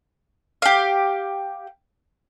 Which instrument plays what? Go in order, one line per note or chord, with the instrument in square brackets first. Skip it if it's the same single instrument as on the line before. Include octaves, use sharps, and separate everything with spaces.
[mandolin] G4 F5